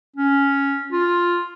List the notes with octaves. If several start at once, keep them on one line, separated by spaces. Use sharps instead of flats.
C#4
F4